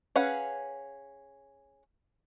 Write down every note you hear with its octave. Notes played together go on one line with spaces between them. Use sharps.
C#4 G#4 B4 F5 F#5